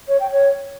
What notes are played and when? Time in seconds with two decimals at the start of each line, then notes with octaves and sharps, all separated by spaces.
0.08 C#5
0.20 G5
0.32 C#5